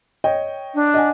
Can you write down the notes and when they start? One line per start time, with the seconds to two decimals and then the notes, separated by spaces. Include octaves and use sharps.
0.24 C#5 D#5 G5
0.75 D4
0.94 D#5 F#5 G#5